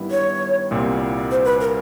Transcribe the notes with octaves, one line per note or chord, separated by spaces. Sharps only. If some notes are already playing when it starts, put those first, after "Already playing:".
Already playing: G2 D#3 G3 B3 E4
C#5
C2 A#2 G3 C4
C5
B4
A#4